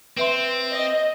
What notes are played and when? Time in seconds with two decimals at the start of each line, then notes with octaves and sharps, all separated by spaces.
0.17 C4 B4 E5 C6
0.73 D#5